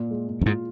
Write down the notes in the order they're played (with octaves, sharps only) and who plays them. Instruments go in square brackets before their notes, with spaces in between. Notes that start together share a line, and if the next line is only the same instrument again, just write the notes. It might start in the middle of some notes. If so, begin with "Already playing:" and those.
Already playing: [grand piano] A#2 F4
G#3
A#2
[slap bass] F2
[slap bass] G#2 [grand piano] F4